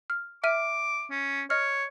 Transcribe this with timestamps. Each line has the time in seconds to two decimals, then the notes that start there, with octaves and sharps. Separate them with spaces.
0.10 F6
0.44 E5 D6 F6 D#7
1.11 C#4
1.50 C#5 D#5 F6